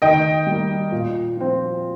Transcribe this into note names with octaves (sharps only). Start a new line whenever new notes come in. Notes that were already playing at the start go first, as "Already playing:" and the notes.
D#3 D#5 G5
G3 A#3
A#2
F3 C4